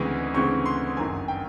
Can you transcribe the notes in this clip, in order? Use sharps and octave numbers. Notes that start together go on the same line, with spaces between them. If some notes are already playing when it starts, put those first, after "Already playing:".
Already playing: D2 C#3 E3 G#3 C4
D2 C#3 E3 G#3 C4 C#6
C6
G1 F#2 D#3 G#5
G5